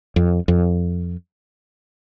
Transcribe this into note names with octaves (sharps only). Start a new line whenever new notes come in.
F2
F2